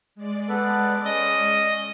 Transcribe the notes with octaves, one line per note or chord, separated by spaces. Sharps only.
G#3 D5
B3 A4 B4
C#4 D#5